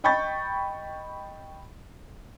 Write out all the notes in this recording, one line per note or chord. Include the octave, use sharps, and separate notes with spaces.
D#5 G5 B5 C#6 G6 A6